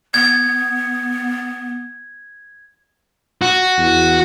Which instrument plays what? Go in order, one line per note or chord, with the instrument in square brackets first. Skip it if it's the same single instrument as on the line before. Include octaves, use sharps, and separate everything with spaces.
[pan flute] B3 [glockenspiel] G#6
[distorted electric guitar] F#4
[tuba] E2